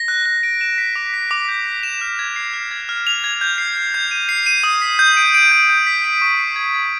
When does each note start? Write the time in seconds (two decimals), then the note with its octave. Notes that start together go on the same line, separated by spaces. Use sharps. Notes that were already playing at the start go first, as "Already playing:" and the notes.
Already playing: A#6
0.08 F#6
0.26 F#6
0.43 D7
0.61 E7
0.78 B6
0.96 D6
1.14 B6
1.31 D6
1.48 G6
1.66 B6
1.83 E7
2.01 F6
2.19 G#6
2.36 C7
2.53 F6
2.71 G#6
2.89 F6
3.07 F7
3.24 G#6
3.41 G6
3.58 C7
3.76 C7
3.94 G6
4.11 D#7
4.29 C7
4.46 D#7
4.64 D#6
4.82 B6
4.99 G6
5.17 D7
5.35 D7
5.52 G6
5.70 G6
5.87 B6
6.04 D7
6.22 C#6
6.39 C7
6.56 G#6
6.74 G#6